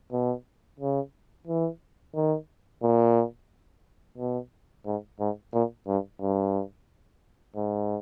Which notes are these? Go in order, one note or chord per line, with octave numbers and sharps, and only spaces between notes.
B2
C#3
E3
D#3
A#2
B2
G#2
G#2
A#2
G2
G2
G#2